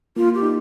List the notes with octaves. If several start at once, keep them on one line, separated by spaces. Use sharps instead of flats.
A#3 F4
G4
D#4